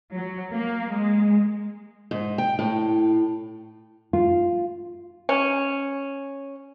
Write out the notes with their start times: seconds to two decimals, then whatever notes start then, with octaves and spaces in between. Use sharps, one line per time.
0.12 F#3
0.52 A#3
0.93 G#3
2.11 G#2
2.38 G5
2.59 A2
4.13 F4
5.29 C#4